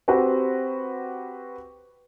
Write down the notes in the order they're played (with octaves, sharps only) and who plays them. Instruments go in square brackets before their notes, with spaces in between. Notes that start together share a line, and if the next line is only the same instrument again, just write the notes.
[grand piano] C4 F#4 G4 B4 C5